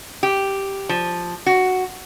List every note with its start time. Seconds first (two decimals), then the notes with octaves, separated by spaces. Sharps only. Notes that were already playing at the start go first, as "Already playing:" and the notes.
0.23 G4
0.89 F3
1.46 F#4